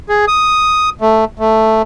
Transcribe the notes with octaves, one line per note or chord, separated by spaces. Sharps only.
G#4
D#6
A3
A3